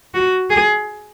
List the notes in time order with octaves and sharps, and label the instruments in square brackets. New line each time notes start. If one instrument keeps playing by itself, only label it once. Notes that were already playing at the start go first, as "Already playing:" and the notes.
[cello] F#4
G#4